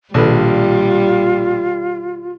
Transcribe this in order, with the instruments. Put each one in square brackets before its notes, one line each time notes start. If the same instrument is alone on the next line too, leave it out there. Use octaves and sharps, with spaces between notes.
[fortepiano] A#1 B4 [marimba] B2 D#3 A4 [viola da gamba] G3 [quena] F4